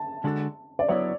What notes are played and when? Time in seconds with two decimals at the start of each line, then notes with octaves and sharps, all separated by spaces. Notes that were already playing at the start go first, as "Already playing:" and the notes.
Already playing: A5
0.24 D3 G#3 D4 F#4 A4
0.79 D5
0.88 F#3 B3 E4 C#5